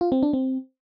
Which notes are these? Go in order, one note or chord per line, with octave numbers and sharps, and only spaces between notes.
F4
C4
D4
C4